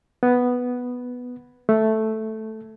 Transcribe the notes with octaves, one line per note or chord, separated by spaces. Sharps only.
B3
A3